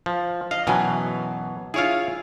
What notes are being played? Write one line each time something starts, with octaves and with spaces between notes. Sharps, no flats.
F3
D#5 F5
F#2 B2 E3 F#3 G#5
E4 F4 G#4 C#5 F5